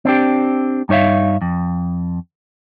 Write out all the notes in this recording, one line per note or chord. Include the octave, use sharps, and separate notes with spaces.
C4 D4 G4
G2 D#4 C#5 E5 F5
F2